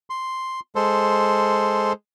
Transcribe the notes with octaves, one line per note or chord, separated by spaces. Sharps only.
C6
G#3 A4 C5